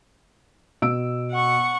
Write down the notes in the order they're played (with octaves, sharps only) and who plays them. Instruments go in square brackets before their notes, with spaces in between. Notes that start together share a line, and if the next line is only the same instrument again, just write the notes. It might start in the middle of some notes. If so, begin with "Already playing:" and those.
[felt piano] B2 E6 D7
[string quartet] F#5 C#6